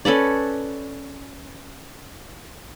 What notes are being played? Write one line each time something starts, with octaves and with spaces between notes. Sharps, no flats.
C#4 A4 B4 D5